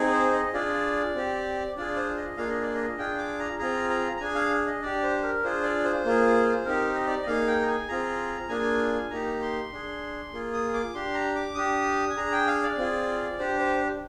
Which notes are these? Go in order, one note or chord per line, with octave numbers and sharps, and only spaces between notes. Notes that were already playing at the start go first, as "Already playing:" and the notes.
Already playing: C4 D#4 G#4
C5
D#5
D4 F4 G#4 D5
C4 G4
D4 F4 G#4 D5
C5
D#5
A#3 D4 F4 G#4 F5
D#5
D5
D#5
D4 F4 G#4 G5
D6
A#5
C4 F4 G#4 A#5
A#5
A#5
D4 G#4 G#5
F5
D#5
D4 G4 D5
C5
A#4
D4 F4 G#4 C5
D5
C5
A#3 F4 G#4
C4 D#4 G4 A#4
D#5
D5
D#5
A#3 D#4 G#4 F5
G5
A#5
G#5
C4 F4 G#4 A#5
A#3 D4 F4 G#4 G#5
A#3 D#4 G4 A#5
C6
D4 G#4
A#3 F4 G#4
D#6
D6
D4 G4 C6
A#5
D6
D4 G4 D#6
G#5
D4 G#4 A#5
G5
F5
D5
C4 F4 G#4
D4 G4 C5
C5